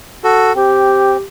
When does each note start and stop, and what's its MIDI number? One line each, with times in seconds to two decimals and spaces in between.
0.24 0.53 66
0.24 0.53 69
0.55 1.17 60
0.55 1.23 67